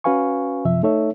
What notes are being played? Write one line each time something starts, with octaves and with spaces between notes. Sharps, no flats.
C#4 F#4 B4 F5 G#5 C#6
F#2 C3 F3 E5
A3 D#4 A4 C#5 E5